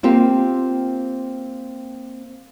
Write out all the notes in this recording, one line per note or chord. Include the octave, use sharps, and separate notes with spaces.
A#3 C4 F4 G4